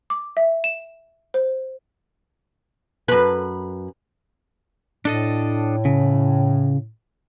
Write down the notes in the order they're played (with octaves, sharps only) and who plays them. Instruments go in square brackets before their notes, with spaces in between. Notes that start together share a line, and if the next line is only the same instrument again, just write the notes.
[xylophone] D6
E5
E7
C5
[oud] F#2 B4
[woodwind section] A2 [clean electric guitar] D4 A4 D#5
[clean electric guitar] C#3